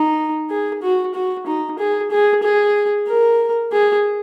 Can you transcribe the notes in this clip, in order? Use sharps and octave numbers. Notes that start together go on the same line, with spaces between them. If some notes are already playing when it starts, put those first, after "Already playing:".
Already playing: D#4
G#4
F#4
F#4
D#4
G#4
G#4
G#4
A#4
G#4